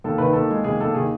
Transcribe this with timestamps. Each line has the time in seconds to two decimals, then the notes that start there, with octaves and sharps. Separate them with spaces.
0.04 D#2 A4
0.18 D#3 B4
0.33 D#2 A4
0.51 G#3
0.64 D#2 G#4
0.81 D#2 A4
0.94 D#3 G#4